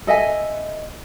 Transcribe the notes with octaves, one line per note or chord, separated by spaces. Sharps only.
A4 D#5 E5 G#5